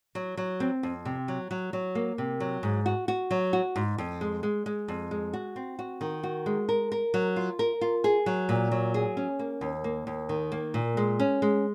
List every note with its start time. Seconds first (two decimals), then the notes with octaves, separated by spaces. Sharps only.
0.15 F#3
0.37 F#3
0.60 C4
0.83 F2
1.05 C3
1.28 F#3
1.51 F#3
1.73 F#3
1.95 A#3
2.18 C3
2.40 F#3
2.63 G#2
2.86 F#4
3.08 F#4
3.31 F#3
3.53 F#4
3.76 G#2
3.98 F2
4.21 G#3
4.43 G#3
4.66 G#3
4.88 F2
5.11 G#3
5.33 F#4
5.56 C4
5.79 F#4
6.01 D#3
6.23 F#4
6.46 G#3
6.69 A#4
6.92 A#4
7.14 F#3
7.36 F4
7.59 A#4
7.81 F4
8.04 G#4
8.26 F#3
8.49 A#2
8.72 F#3
8.94 G#4
9.17 C#4
9.39 A#3
9.61 D#2
9.84 A#3
10.07 D#2
10.29 D#3
10.52 A#3
10.74 A#2
10.97 G#3
11.20 C#4
11.42 G#3